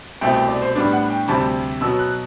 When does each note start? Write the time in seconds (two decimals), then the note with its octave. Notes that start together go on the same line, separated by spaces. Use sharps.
0.21 C2 B2 A3 C4 E4 G5
0.34 G5
0.48 D5
0.62 C5
0.75 A2 G3 B3 D4 D5
0.93 F#5
1.10 G5
1.28 D2 C3 G3 C4 A5
1.81 B2 F#3 B3 E6
1.99 F#6